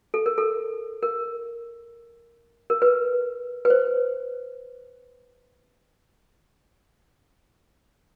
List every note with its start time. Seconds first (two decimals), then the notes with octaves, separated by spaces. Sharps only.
0.14 A4
0.26 A#4
0.38 A4
1.03 A#4
2.70 A#4
2.82 B4
3.65 B4
3.70 C5